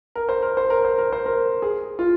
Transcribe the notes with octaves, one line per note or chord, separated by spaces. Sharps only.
A#4
C5
A#4
C5
A#4
C5
A#4
C5
A#4
G#4
F4